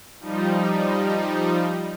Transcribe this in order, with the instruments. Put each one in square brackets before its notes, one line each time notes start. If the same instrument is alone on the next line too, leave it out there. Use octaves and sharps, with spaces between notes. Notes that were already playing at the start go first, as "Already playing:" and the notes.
[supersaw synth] F3 G3 D#4